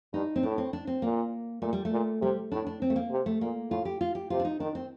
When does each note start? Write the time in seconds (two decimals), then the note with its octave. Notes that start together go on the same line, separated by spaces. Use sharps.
0.13 G2 D#4
0.36 C4
0.43 A2 D4
0.58 C4
0.73 D4
0.87 C4
1.02 A#2 A#3
1.62 A#2 A3
1.73 G3
1.85 A3
1.92 A#2
2.21 C3 G3
2.51 A2 D4
2.66 D4
2.82 C4
2.90 A3
2.96 A#3
3.11 C3
3.26 A3
3.41 A#2 A#3
3.70 A2 F4
3.85 G4
4.01 F4
4.15 G4
4.30 C3 F4
4.40 D4
4.45 D#4
4.60 D#3 D4
4.75 C4